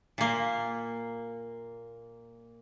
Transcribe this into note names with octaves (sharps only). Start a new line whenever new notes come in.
A#2 A#3